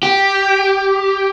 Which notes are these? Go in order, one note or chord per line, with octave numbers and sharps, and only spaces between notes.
G4